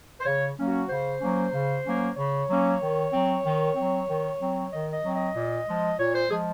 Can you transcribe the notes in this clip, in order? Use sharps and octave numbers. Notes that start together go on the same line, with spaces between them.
C5
C#3 C#5
F#3 A#3 C#4
F#4
C#3 C5
F#3 A#3 C#4
C#3
F#3 A#3 C#4
C#3 C#5
F#3 A#3 C#4
D#3
F#3 C4
D#3
F#3 C4
D#3
F#3 C4
D#3 D#5
D#5
F#3 C4
D#5
A#2
F3 G#3
A#2 C#5
C5
F3 G#3 G#4